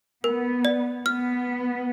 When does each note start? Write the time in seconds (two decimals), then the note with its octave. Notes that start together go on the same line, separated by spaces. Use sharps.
0.24 B3 A#4
0.65 D5
1.05 B3 F6